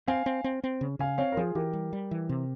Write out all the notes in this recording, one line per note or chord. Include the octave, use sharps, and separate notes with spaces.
C4 F5 G#5
C4
C4
C4
C#3
C#3 F5 G#5
C4 C#5 F5
A#4
F3 F4 G#4
E3 G4 A#4
G3
G3
E3
C3